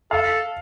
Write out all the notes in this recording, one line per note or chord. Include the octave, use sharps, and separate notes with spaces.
A4 F5